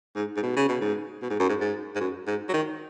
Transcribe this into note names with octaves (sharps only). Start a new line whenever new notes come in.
G#2
G#2
B2
C#3
B2
G#2
B2
G#2
F#2
G#2
G#2
G#2
F#2
G#2
F#3
D#3